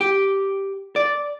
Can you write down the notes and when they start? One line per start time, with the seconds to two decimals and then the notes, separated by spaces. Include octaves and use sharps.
0.01 G4
0.96 D5